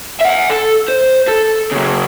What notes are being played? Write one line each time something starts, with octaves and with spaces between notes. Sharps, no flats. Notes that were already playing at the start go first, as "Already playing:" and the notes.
E5 F#5
A4
C5
A4
C#3 F#3